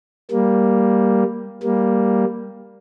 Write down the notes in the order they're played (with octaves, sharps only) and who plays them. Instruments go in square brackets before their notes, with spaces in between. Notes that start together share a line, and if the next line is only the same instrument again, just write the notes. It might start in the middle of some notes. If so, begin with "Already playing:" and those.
[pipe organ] G3 A#3
G3 A#3